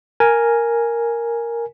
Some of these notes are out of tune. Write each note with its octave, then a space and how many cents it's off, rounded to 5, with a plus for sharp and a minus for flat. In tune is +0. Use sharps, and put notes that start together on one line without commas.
A#4 +0 G#5 +0